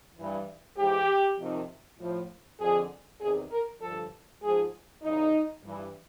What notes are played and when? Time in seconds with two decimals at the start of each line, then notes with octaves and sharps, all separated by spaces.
0.17 G2 E3
0.77 G#2 E3 G4
1.39 F2 C3 D#3
1.99 A2 F3
2.60 F2 D3 F3 G#4
3.21 E2 C3 D#3 G#4
3.51 A#4
3.82 G2 D3 F3 A4
4.43 G#2 F3 G#4
5.03 E2 C#3 E3 D#4
5.65 G2 E3